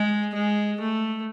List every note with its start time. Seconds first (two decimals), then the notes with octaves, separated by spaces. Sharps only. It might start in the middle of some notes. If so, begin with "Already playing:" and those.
Already playing: G#3
0.34 G#3
0.80 A3